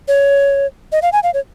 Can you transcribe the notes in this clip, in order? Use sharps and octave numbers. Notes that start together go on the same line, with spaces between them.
C#5
D#5
F5
G#5
F5
C#5